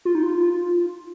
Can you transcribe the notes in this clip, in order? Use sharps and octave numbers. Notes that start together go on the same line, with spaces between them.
F4
D#4
F4